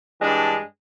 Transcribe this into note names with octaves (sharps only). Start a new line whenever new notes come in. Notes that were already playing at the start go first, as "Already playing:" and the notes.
G2 E3 G#3 D4